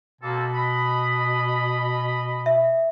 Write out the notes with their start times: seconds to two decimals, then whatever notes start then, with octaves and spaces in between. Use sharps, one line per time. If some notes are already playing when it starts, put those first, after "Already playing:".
0.21 B2 A#3 C4 A4
0.53 D#5 B5
2.46 E5